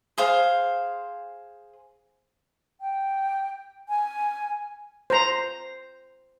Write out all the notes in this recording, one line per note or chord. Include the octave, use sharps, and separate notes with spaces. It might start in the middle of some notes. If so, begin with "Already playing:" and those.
G#4 C5 F5
G5
G#5
C5 A#5